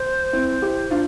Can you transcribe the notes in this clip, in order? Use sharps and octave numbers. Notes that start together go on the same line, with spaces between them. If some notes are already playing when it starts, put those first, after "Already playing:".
Already playing: C5
C4 E4
E4 G4
D4 F4